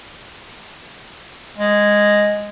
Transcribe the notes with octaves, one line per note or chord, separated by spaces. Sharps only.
G#3